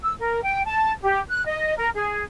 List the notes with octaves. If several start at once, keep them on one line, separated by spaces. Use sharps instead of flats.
E6
A#4
G5
A5
G4
F#6
D#5
A#4
G#4